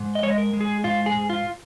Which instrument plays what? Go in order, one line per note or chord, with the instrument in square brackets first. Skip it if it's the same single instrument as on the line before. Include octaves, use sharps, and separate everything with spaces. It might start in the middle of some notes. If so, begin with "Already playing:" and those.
Already playing: [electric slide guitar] G#2
D#5
G#3 C#5
D#5
A#4
G#3
G#4
G#2 F4
G#4
G#2
F4